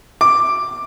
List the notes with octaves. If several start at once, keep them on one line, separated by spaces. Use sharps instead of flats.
D6